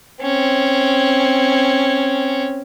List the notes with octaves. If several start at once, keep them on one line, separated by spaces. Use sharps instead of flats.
C4 C#4